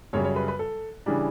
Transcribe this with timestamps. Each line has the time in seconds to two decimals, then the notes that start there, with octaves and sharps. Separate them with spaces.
0.13 F#2 C#3 G3 C#5
0.24 C#5
0.36 B4
0.48 B4
0.59 A4
1.06 C#3 E3 G3 D4